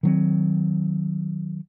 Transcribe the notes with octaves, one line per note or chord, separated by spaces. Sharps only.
D#3 F#3 C4